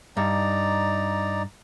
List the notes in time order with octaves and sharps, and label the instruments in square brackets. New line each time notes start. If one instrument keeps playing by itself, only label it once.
[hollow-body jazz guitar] G2 [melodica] D#4 D5 A#5